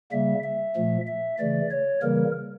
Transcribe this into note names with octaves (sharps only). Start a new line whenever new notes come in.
C#3 G3 A#3 E5
E5
A#2 F3 A3
E5
C#3 E3 A3 D5
C#5
C#3 E3 G3 A#3 A#4